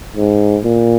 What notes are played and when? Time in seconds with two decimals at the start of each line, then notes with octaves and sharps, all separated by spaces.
0.17 G#2
0.63 A#2